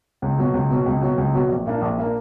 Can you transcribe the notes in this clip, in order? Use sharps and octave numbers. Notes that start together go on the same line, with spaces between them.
C#2
B2 F#3
C#2
B2 F#3
C#2
B2 F#3
C#2
B2 F#3
A#1
A#2 A#3 D4
A#1
A#2 A#3 D4